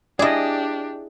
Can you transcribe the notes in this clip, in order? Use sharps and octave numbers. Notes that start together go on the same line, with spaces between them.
D4 E4 G4 G#4 D5 D#5